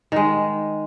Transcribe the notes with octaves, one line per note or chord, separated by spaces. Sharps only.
D#3 G#3